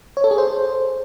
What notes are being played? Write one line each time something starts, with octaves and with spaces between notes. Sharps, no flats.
C#5
A4
G#4
C5